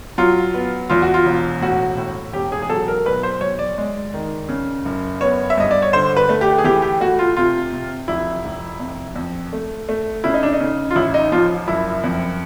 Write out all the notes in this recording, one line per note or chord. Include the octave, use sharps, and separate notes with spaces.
F#3 F4
B3
E2 F4
F#4
F4
E1
A2 F#4
A2
E1 G4
G#4
G#4
F#3 A4
A#4
B1 B4
C5
B1 C#5
D5
G#3
D#3
C#3
F#1
B3 C#5
E5
G2 D#5
D5
C#5
D3 C5
B4
A3
G4
G#4
E3 G4
G4
A3 F#4
F4
C3 F4
C3
F1 E4
F1
F2
F2
A3
A3
C#3 E4
D#4
D4
D#4
C#3
F4
A1 E4
D#4
F3 F4
F#1 E4
F2